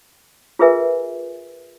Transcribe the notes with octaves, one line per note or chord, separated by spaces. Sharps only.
F4 G#4 A#4 B4 E5 G#5